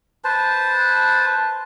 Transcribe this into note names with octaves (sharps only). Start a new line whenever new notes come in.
B4 C5 A5